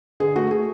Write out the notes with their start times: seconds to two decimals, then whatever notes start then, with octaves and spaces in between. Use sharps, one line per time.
0.20 D3 G#4
0.36 A3 F#4
0.51 A3 G#4